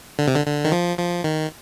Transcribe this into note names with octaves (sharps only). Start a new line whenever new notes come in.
D3
C3
D3
D3
D#3
F3
F3
D#3